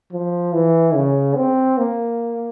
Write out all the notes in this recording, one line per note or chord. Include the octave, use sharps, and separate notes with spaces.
F3
E3
C#3
C4
A#3